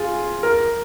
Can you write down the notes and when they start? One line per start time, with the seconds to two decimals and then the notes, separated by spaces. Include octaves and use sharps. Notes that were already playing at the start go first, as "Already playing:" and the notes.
Already playing: F4 G#4
0.43 A#4